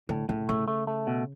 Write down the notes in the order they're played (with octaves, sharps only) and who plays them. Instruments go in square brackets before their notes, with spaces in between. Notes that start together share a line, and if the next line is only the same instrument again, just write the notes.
[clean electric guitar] A2 [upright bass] D3
[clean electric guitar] A2 [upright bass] C#3
[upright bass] C#3 [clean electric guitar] A3
[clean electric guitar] A3
A3
B2